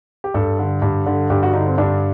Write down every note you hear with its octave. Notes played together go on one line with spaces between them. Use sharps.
G4
G2 A4
D3
G2
D3
G2 G4
F#4
D3 D#4
C4
G2 D4